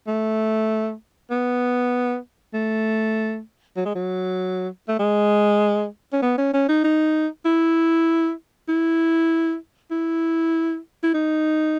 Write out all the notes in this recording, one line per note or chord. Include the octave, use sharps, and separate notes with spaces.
A3
B3
A3
F#3
G#3
F#3
A3
G#3
C#4
B3
C#4
C#4
D#4
D#4
E4
E4
E4
E4
D#4